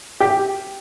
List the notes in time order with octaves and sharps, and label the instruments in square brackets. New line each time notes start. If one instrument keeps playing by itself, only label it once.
[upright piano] G4